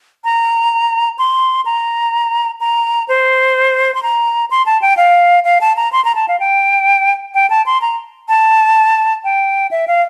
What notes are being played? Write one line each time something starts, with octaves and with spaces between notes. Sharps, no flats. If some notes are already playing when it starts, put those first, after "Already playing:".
A#5
C6
A#5
A#5
C5
C6
A#5
C6
A5
G5
F5
F5
A5
A#5
C6
A#5
A5
F5
G5
G5
A5
C6
A#5
A5
G5
E5
F5